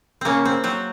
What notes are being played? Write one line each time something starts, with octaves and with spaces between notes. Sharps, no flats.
C#3 A#3 C4 C#4
C4
F#3 C4